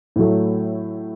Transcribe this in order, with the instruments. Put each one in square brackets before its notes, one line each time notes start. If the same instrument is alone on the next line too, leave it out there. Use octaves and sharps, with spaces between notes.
[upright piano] A2 F#3 A3